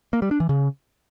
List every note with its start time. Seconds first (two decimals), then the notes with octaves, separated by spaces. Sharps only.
0.13 A#3
0.22 G3
0.31 D4
0.40 E3
0.49 C#3